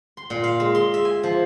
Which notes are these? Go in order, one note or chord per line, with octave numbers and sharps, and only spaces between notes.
C6
A#2
F5
G#3
C6
E5
G#5
F3